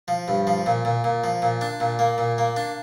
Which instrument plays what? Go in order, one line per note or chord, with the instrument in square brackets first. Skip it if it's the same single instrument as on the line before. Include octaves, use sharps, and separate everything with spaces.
[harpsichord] F3
G2
F3
A#2
A#2
A#2
F3
A#2
D4
A#2
A#3
A#2
A#3
D4